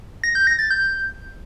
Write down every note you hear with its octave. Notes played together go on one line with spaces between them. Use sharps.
A#6
G6
A#6
A6
G6